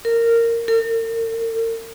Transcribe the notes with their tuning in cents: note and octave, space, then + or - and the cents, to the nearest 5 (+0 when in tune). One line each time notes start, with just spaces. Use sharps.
A#4 -15
A#4 -40